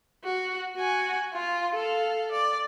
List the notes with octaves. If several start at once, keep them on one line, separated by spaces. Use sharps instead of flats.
F#4
F#4 G#5
F4
A4 F5
D5